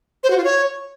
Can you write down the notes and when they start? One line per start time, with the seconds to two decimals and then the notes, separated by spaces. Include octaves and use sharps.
0.23 C5
0.30 F#4
0.37 F4
0.44 C#5